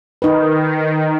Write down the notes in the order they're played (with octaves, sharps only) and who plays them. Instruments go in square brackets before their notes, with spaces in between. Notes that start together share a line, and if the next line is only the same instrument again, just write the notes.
[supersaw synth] D#3 [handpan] D#4 B4